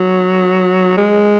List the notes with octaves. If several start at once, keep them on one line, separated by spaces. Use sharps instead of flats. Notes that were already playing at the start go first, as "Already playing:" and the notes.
Already playing: F#3
G#3